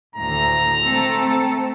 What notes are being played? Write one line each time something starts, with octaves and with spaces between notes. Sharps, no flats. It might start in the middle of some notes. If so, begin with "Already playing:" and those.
D2 A2 A#5
A3 C4 A4